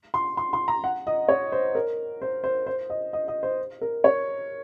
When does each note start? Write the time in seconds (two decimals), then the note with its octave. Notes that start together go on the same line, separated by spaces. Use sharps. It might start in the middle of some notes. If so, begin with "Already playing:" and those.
0.14 C6
0.37 C6
0.53 C6
0.68 A#5
0.84 F#5
1.07 D#5
1.28 C#5
1.52 C5
1.75 A#4
2.22 C5
2.44 C5
2.67 C5
2.90 D#5
3.13 D#5
3.28 D#5
3.43 C5
3.81 A#4
4.04 C#5